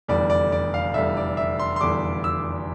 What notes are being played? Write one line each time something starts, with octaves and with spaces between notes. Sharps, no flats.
F1 E2 D3 G3 D5
D5
D5
F5
F1 E2 D3 G3 E5
D5
E5
C6
C6
F1 E2 D3 G3 D6
E6